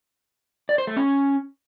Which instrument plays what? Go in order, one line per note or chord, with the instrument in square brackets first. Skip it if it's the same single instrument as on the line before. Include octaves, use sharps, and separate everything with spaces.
[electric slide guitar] D5
C5
A3
C#4